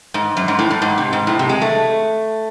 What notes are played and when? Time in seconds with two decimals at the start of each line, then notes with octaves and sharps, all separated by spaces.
0.14 G#2
0.37 F#2
0.48 G#2
0.59 A2
0.71 A2
0.82 G#2
0.98 C3
1.13 G#2
1.27 A2
1.39 C3
1.49 G#3
1.62 A3